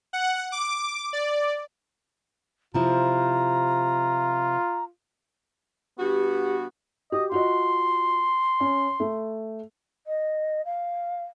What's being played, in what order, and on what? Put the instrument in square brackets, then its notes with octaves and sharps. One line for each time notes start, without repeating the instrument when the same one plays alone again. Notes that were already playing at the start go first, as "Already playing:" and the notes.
[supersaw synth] F#5
D6
D5
[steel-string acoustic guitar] C3 F3 E4 [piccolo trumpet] F4 [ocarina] A#5
[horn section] G2 B3 F#4 [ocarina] G4
[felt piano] F#4 G4 [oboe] D#5
[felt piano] F4 F#4 D#5 [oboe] C6
[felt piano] C#4
A3
[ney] D#5
F5